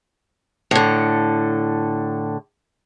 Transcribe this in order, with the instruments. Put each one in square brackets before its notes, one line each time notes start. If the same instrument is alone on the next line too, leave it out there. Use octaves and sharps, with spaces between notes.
[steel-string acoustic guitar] A2 D3